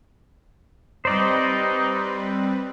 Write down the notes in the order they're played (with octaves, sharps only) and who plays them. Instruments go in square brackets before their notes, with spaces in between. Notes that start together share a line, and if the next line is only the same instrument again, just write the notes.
[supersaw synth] G3 C4 B4 [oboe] D#4 [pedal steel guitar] C5 D5 D#5